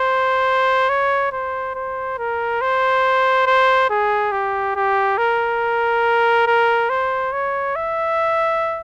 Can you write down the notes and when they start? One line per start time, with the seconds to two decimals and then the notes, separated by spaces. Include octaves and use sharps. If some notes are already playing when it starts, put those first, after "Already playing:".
Already playing: C5
0.89 C#5
1.32 C5
1.75 C5
2.18 A#4
2.61 C5
3.47 C5
3.90 G#4
4.32 G4
4.76 G4
5.18 A#4
6.47 A#4
6.90 C5
7.33 C#5
7.76 E5